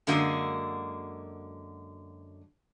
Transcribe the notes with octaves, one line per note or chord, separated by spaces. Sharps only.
F#2 D3 G#3 A#3 F#4